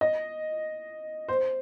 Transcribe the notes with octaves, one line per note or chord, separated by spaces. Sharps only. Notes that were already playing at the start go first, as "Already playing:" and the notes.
D#5
C5